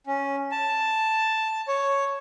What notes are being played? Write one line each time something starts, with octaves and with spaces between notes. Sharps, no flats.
C#4
A5
C#5